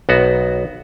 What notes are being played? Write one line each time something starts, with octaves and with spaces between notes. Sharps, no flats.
B1 B3 F#4